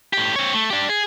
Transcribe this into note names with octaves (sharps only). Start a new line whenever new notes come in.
A2 G4
C4 C#5
A3
D4 G4
G#4